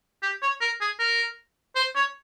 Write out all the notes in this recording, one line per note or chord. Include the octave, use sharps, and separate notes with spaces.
G4
C#5
A#4
G#4
A#4
C5
C#5